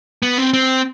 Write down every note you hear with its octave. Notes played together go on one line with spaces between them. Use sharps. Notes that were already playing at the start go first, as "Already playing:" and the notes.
B3
C4
C4